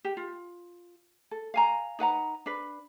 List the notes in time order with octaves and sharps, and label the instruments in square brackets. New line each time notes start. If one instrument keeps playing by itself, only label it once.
[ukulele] G4
F4
A4
F5 G#5 A#5
D#4 B4 F#5 A#5
D4 B4